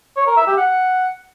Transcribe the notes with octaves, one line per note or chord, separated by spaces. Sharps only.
C#5
A#4
E5
G4
F#5